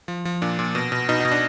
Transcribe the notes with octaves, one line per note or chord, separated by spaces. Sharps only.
F3
F3
A#2 D4
A#2
B2
B2
B2 D#4
D#4
B2
D4